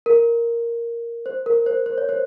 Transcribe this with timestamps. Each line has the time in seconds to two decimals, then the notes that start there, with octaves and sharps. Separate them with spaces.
0.06 A#4
1.26 C5
1.46 A#4
1.66 C5
1.86 C5
1.98 C#5
2.09 C5